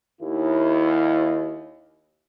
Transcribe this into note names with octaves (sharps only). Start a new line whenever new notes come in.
D#2 E4